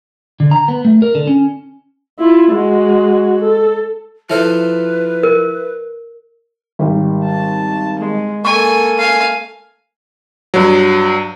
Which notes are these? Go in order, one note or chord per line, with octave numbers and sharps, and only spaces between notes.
D3
A#5
B3
A3
A#4
D3
C#4
E4 F4
G#3 F#4
A4
F3 E4 A4 B4 C5 E5 F6
A#4
G#1 G3
A5
G#3
A#3 A4 G#5 C#6
F5 G#5
G2 F#3